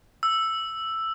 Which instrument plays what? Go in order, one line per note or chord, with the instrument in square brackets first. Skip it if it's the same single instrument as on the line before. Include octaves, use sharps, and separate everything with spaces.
[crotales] E6